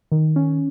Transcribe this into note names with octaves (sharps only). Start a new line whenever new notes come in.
D#3
C#4